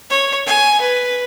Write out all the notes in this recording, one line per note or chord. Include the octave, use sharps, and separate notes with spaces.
C#5
G#5
B4